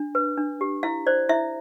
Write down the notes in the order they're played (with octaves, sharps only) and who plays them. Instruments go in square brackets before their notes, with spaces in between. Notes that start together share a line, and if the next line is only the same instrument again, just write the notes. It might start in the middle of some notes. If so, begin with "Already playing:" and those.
Already playing: [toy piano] D4
B4
D4
G4
E4 F5
C5 D5
E4 E5